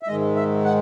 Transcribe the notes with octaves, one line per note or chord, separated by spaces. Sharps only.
E5
G#2 D#3 G#3 D#5
E5
F#5